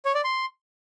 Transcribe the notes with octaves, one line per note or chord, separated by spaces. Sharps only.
C#5
D5
C6